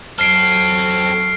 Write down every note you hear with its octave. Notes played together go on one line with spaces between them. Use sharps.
F#3 C4 A4 F6 C7 D7